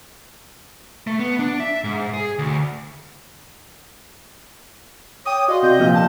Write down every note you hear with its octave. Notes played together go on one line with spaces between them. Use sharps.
A3
B3
D4
E5
G#2
G#4
D2
C#5 G5 D6 D#6
F#4 D5 D#5 F5 C6
C3 G6
G2 A#2 F3 F6
A5